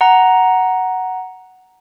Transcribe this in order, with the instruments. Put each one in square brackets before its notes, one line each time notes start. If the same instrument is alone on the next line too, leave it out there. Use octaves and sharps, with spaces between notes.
[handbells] F#5 A#5